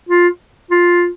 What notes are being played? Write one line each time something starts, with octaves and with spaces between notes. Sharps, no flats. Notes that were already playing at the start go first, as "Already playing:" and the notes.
F4
F4